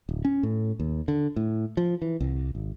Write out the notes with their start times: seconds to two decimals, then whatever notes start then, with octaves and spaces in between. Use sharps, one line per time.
0.09 D1
0.25 C#4
0.43 A2
0.80 D#2
1.08 D3
1.36 A2
1.77 F3
2.02 E3
2.20 C2
2.55 G#1